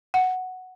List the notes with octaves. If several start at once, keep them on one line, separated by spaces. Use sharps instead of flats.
F#5